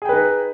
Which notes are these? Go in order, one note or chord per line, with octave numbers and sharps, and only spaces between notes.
D#4 G#4 B4 G5